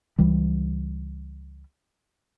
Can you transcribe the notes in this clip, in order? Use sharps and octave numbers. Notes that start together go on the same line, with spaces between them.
C#2 E3 G3